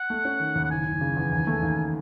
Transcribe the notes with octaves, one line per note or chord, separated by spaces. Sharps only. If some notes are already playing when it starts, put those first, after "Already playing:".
Already playing: F#5
A3
C#4
D#3
D#2
F#5
F#1 G#5
F#1
C#3
E2
D#2
A3
D#2